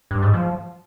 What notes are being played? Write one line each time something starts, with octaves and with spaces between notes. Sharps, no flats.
G2
G#2
F3